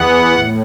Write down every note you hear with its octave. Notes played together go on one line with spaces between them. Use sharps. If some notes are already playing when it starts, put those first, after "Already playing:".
Already playing: E2 E3 B3 F#5
A2